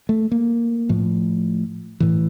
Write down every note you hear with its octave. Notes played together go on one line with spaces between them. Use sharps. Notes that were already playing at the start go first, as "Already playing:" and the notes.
A3
A#3
A2 F3
A2 E3